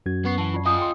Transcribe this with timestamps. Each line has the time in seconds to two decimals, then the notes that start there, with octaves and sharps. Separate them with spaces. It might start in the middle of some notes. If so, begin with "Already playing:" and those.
0.06 F#2 F#4 G#6
0.25 F#2 B3 C#6 C7
0.38 E3 F#5 A5
0.54 F4 D5
0.66 F4 D#5 F#5 G#5 D#6
0.78 G5 C6